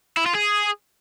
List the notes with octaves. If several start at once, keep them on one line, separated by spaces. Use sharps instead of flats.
E4
F4
G#4